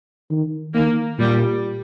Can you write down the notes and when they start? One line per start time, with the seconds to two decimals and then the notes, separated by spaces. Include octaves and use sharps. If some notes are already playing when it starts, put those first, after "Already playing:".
0.31 D#3
0.74 D#3 A#3
1.18 A#2 G3